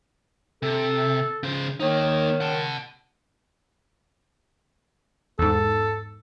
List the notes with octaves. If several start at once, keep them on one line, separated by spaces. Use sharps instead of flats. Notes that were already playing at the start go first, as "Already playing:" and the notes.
C3 A4
C#3 C5
D#3 A#3 D#4 C#5
F#5 A5
E2 G#2 A4